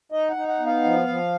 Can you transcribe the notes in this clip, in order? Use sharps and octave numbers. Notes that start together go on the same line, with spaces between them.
D#4 D#5
F#5
D#4
F#5
B3
F5
F3
F3